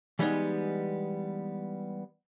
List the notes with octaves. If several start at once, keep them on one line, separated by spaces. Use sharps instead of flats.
E3 G3 G#3 B3 C#4 D#4